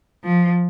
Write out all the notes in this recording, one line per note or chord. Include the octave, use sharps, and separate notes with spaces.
F3